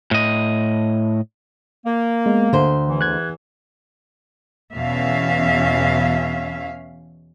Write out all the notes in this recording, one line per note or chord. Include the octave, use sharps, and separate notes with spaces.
A2 D#5
A#3
G#3 B3
D2 D3 C5
E2 E3
F#6 G#6
E2 B2 C#4 E5 F5